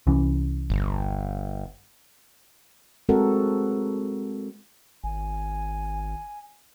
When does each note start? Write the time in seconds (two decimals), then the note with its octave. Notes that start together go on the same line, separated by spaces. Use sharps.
0.07 C2 E3 C#4
0.70 G1
3.09 G#3 C4 F#4 A4 A#4 F#5
5.04 G#1 G#5